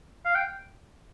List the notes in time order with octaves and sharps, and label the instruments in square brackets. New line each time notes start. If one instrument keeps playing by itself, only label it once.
[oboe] F5
G5